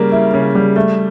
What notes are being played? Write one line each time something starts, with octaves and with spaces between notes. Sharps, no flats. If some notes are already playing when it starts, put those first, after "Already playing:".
Already playing: C#3 G3 A#3
E4
C#3
G3
A3